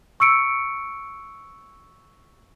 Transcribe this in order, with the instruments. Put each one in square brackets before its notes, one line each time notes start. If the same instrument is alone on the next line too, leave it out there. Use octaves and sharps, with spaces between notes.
[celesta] C#6 E6 C#7 D7